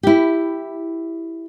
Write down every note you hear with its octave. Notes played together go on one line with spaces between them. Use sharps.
E4 G4